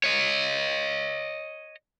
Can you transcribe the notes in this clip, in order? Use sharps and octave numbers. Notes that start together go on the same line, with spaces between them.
C#5 D#5